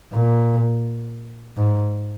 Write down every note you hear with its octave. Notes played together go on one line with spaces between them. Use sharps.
A#2
G#2